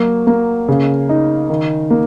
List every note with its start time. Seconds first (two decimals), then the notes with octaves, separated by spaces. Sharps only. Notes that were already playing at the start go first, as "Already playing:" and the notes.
Already playing: F#3 A#3
0.27 A#3
0.69 C#3
1.09 D#4
1.50 D#3
1.90 A#3